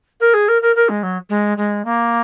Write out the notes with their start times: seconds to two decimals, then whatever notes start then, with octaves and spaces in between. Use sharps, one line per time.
0.20 A#4
0.34 G#4
0.48 A#4
0.62 A#4
0.76 A#4
0.89 G#3
1.03 F#3
1.29 G#3
1.57 G#3
1.85 A#3